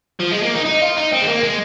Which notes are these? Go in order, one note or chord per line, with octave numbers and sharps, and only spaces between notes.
F3
G#3
A#3
D#4
D#4
F4
D#4
C4
G#3
A#3
G#3